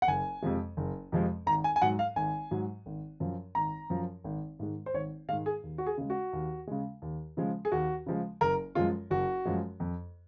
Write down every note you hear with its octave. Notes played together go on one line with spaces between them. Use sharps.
F#5
F#1 G#5
F2 C3 F3 G#3
F#1
F2 C3 F3 G#3
G#1 A#5
G#5
G#5
G#2 F#3 F#5
F5
G#1 G#5
G#2 F#3
G#1
F#2 F3
G#1 A#5
F#2 F3
G#1
G#2 D#3 G#3
C5
G#1 C#5
G#2 D#3 G#3 F5
G#4
D#2
F#4
G#4
C#3 G#3
F#4
D#2
C#3 G#3
D#2
C#3 F3 G#3
G#4
D#2 F#4
C#3 F3 G#3
F#1 A#4
F#2 F3 G#3 F4
F#1 F#4
F#2 F3 G#3
F2